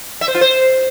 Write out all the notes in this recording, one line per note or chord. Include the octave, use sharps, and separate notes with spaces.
E5
C5
F4
C5